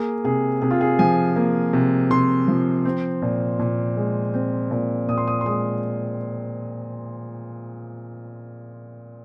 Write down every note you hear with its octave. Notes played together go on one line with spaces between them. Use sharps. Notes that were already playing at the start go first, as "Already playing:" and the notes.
Already playing: A#3 G#4
C3 G#4
C3 G#4
F4
G#4
F3 G#5
A#3
C3
C3 C6
F3
C4
A#2
A#2
G#3
C4
A#2
A#2 D#6
C6
D#6
C6
G#3 D#6